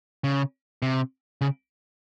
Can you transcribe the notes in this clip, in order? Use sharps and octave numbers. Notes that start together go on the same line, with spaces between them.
C#3
C3
C#3